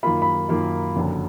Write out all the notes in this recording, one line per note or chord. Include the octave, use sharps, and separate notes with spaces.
F#2 D#3 A#3 F4 B5
B5
F#2 D#3 A#3 F4
F#1 F2 D3 F#3 D4